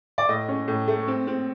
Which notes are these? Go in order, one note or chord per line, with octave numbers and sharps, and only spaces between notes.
D5
A2 D#5
C#4
A2
A3
C4
C4